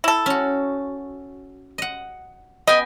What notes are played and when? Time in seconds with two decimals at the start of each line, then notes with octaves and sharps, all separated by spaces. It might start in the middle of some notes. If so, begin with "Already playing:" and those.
0.04 E4 A4
0.26 C#4 F#4
1.78 D#5 F#5
2.67 B3 D#5 G5 G#5